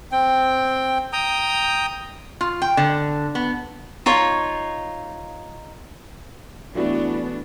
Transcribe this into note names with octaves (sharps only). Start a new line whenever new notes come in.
C4 G5
G5 A#5 D#6
F4
G5
D3
B3
D#4 F4 C#5
E3 A3 B3 D4 E4 F#4